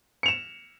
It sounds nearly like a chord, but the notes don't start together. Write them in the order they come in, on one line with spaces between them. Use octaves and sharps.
C#7 F7 E7